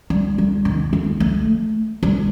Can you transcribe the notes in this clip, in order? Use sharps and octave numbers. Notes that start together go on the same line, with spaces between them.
G3
G3
D#3
A3
A3
G3